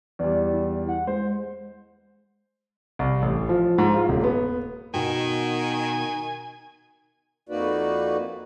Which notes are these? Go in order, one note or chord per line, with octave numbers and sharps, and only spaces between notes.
E2 G3 D5
E4
F#5
G#3 C5
C2
A1
F3
G#2
F4
D#1
B3
B2 D#3 F#4 G5 G#5
F2 A#3 D#4 F#4 B4 D5